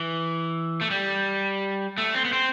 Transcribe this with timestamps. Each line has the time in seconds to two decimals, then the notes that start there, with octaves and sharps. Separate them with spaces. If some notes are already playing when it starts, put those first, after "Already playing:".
Already playing: E3
0.81 A3
0.90 G3
1.98 A3
2.14 C4
2.25 B3
2.33 C4